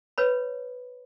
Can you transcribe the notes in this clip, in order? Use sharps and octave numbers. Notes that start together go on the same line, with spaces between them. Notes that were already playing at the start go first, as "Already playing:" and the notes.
B4 C#5 B5